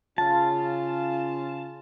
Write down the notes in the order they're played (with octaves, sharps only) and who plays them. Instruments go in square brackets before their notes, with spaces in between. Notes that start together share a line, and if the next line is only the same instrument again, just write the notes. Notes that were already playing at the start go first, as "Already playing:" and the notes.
[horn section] C#3 C#4 F4 [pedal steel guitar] A5